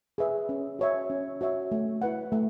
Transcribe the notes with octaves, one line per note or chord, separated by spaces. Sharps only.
G#4 B4 E5
C#4
F#4 C#5 E5
C#4
F#4 C#5 E5
A3
E4 B4 F#5
A3